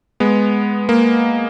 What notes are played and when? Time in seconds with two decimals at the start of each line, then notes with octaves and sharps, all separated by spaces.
0.20 G#3 B3
0.89 A#3